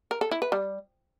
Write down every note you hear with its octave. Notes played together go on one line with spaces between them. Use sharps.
A#4
A4
E4
B4
G3